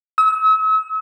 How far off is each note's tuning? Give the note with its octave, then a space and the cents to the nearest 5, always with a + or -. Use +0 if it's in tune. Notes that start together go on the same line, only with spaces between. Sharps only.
E6 -45